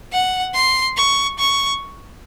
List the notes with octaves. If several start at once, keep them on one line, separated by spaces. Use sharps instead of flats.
F#5
C6
C#6
C#6